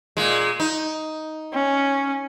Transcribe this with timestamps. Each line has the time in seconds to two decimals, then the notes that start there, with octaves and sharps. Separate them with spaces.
0.17 A#2 G#3
0.60 D#4
1.53 C#4